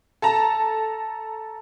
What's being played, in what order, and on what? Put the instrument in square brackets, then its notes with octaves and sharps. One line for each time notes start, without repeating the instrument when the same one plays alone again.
[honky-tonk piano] A4 A5 A#5